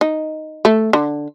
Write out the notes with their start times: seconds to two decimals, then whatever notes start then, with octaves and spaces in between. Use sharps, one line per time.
0.01 D#4
0.65 A3
0.93 D3